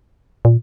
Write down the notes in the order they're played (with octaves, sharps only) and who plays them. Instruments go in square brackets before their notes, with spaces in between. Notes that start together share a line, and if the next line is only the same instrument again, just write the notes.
[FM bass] A#2